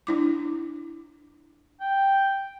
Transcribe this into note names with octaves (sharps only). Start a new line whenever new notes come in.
D4 E4 D6
G5